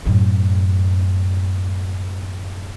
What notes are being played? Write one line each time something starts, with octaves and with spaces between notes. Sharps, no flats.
F#2 A2